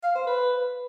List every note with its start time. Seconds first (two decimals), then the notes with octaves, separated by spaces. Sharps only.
0.03 F5
0.15 C5
0.27 B4